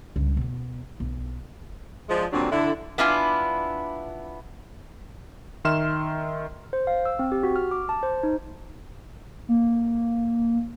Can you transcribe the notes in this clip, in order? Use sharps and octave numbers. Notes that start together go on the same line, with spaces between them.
C#2 G2
B2 B3
B1
F3 G#3 D4
A#2 D3 F#3 G3 C4 D4
D3 E4
B3 D4 E4 F4 G#5
D#3 E5 C6 F6 E7
C5
F5
E6
C4
G4
F#4
F6
D6
A5
C5
D#4
A#3